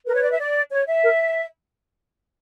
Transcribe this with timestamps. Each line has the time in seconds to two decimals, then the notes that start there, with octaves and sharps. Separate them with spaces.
0.06 A#4 B4
0.15 C#5
0.23 D5
0.32 E5
0.39 D5
0.72 C#5
0.87 E5
1.04 A#4